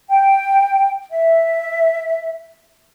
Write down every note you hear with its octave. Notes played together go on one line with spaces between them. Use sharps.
G5
E5